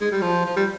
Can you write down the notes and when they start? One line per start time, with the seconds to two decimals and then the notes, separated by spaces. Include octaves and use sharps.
0.01 G#3
0.11 G3
0.21 F3
0.46 F3
0.56 G3